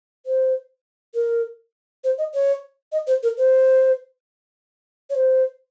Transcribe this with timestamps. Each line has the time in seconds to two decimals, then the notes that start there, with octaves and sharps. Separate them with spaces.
0.26 C5
1.15 A#4
2.04 C5
2.18 D#5
2.34 C#5
2.92 D#5
3.07 C5
3.23 A#4
3.37 C5
5.10 C#5
5.15 C5